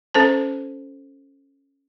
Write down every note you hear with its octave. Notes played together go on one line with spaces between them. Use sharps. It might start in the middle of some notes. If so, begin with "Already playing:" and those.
C#4 A4 C5 A5